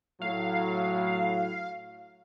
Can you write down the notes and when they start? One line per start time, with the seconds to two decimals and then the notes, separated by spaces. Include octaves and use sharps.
0.22 A2 F#3 F5